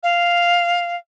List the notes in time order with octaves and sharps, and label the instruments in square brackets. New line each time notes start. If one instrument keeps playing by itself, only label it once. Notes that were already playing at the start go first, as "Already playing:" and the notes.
[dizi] F5